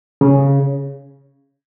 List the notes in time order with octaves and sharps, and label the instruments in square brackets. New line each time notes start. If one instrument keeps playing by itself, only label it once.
[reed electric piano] C#3